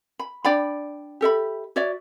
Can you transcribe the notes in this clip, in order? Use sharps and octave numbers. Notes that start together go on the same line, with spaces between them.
B5
D4 D5 G5 B5
G4 A4 E5 B5
F#4 C#5 D5 E5